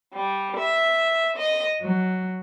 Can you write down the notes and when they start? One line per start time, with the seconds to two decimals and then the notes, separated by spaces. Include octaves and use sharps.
0.14 G3
0.57 E5
1.37 D#5
1.80 F#3